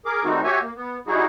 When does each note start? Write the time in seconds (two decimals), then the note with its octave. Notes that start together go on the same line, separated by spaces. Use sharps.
0.06 G#4 A#4 D6
0.25 D#3 G3 A3 C4 D#4 F#4
0.44 F#4 G4 C#5 E5 G#5
0.62 A#3
0.76 B3
1.07 G3 D#4 E4 F#4 G#4